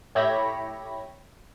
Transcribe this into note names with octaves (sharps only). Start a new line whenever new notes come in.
A2 G4 C#5 E5 B5 A#6